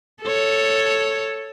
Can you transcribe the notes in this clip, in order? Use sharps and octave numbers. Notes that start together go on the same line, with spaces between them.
A4 C#5